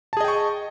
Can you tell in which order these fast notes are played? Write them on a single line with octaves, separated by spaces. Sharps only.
A5 G#4 D#5 G5 C#6